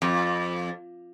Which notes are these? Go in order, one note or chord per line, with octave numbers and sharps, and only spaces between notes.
F2